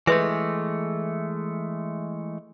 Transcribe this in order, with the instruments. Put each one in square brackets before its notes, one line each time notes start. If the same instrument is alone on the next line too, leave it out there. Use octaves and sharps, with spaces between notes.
[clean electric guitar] E3 G#3 A3 [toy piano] B4 E5